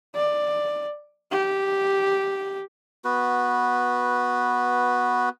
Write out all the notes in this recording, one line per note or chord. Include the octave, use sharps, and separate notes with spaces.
D5
G4
B3 F#4 B4